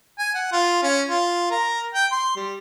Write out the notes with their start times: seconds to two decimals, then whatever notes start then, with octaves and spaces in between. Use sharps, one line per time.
0.19 G#5
0.35 F#5
0.52 F4
0.83 C#4
1.09 F4
1.51 A#4
1.95 G5
2.12 C6
2.36 G3